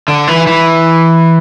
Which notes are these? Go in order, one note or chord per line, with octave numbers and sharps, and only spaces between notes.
D3
E3
E3